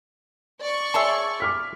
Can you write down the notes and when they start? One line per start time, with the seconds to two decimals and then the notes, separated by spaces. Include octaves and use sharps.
0.61 D5 C#6
0.94 G#4 C#5 E5 A5 C6
1.40 D6 F6 B6